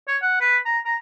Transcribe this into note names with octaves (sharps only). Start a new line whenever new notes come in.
C#5
F#5
B4
A#5
A#5